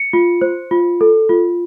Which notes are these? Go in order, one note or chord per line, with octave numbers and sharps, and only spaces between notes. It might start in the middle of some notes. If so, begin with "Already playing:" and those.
Already playing: C#7
F4
C5
F4
A4
F4